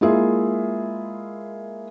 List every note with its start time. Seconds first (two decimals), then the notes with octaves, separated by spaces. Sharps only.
0.01 G#3 A#3 E4 F4 G#4 E5